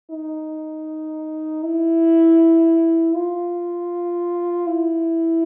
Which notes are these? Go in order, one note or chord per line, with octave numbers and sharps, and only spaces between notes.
D#4
E4
F4
E4